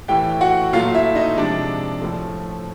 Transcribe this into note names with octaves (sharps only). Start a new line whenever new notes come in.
A2 E3 A3 G4 G5
F#4 F#5
A#2 F#3 A3 F4 F5
E4 E5
D#4 D#5
C3 F3 G#3 D4 D5
A2 F3 A3